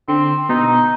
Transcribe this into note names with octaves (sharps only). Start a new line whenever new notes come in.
D3 C4
B2 D#4